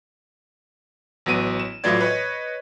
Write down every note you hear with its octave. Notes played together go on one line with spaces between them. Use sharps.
A1 F#3 B3 D7 D#7
E7
A2 E3 F#3 F4 D5 G#6
B4 C#5 D#5